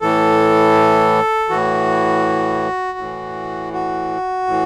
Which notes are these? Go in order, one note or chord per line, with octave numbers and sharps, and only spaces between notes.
A2 E3 A4
A2 E3 F#4
A2 E3
F#4
A2 E3